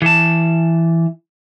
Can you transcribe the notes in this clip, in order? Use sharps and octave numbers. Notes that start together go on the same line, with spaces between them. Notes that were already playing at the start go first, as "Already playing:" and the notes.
E3 A5